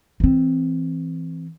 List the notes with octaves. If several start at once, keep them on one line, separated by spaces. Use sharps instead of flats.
E3 C4